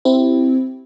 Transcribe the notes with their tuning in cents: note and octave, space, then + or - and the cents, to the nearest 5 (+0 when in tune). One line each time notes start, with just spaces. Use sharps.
C4 -5 E4 +0 G4 -15